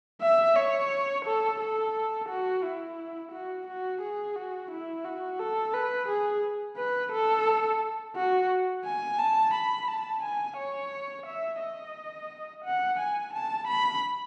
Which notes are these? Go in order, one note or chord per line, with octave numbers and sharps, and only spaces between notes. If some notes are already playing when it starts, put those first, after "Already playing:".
E5
C#5
A4
A4
F#4
E4
F#4
F#4
G#4
F#4
E4
F#4
A4
B4
G#4
B4
A4
F#4
G#5
A5
B5
A5
G#5
C#5
E5
D#5
F#5
G#5
A5
B5